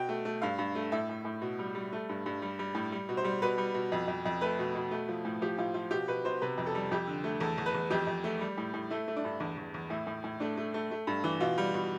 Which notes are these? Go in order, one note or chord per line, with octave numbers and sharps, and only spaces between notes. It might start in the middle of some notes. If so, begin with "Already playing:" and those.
Already playing: B2 G5
A3
A3
G2 F5
G2
A3
A2 E5
A2
A2
B2
G3
G3
A3
G2
G2
G3
G3
A2
G3
B2
C5
G3
B2 B4
G3
B2
F2
F2
F2
A3 B4
B2
B2
A3
F3
A2
F3 G4
A2 F4
F3 F4
B2 G4
B2 B4
B2 C5
C3 B4
F2
A4
G3
F2 G4
D3
A3
E2 A4
E2
B4
E2
F2 G4
F2
A3
G3
A2
A2
A3 E4
A3
D4
G2
E2 D4
E2
E2
A2 E4
A2
A2
A3 D4
A3
A3
A3
G2
E3
B2 F4
G3
B2